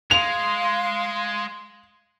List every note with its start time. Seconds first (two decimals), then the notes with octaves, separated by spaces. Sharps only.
0.11 G#3 F5 C6 F7